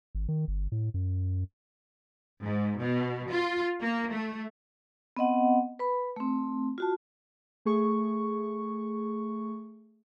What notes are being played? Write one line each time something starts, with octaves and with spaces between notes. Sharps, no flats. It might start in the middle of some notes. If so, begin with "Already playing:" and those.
G#1
D#3
G1
A2
F#2
G#2
B2
F4
A#3
A3
B3 C4 D#5 F#5
B4 B5
A3 C4
F4 F#4 A5
A3 G#4 C#6